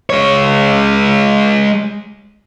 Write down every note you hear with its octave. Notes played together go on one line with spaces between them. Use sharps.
G#3 C#5